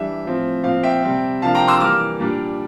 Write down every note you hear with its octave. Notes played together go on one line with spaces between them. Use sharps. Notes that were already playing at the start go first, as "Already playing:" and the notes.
Already playing: E3 G3 D4 E5
A2 F3 C4
A#2 F3 C4 F5
E5 G5
C3 G3 C4
C3 F3 A#3 D4 F5 A5
G5 A#5
C6 E6
E3 G3 A#3 D6 F6
A#2 G3 D4